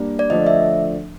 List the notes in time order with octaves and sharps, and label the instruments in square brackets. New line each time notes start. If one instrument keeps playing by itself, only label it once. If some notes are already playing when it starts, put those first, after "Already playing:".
Already playing: [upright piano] G3 A#3 D4
[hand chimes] D5
[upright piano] D3 F3 A3 D4 [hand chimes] D#5
[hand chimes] E5